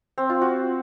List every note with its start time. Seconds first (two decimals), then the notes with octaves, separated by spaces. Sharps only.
0.18 C4
0.30 F4
0.42 F#4